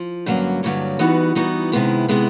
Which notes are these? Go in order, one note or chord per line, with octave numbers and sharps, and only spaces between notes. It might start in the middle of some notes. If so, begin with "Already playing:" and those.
Already playing: F3
G2 D3 F#3 A#3 C#4
G2 D3 F#3 A#3 C#4
E3 G3 B3 D#4 F#4
E3 G3 B3 D#4 F#4
C3 D#3 G#3 B3 E4
C3 D#3 G#3 B3 E4